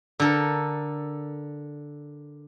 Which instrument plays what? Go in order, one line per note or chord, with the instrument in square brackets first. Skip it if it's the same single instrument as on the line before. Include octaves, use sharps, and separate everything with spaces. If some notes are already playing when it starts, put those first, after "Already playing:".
[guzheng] D3 A4 A#4